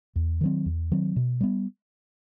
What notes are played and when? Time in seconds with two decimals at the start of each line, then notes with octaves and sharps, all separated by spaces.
0.16 E2
0.41 D#3 F#3 C4
0.66 E2
0.92 D#3 F#3 C4
1.16 B2
1.41 G3 B3